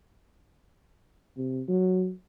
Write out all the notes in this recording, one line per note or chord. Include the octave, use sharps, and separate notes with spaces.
C3
F#3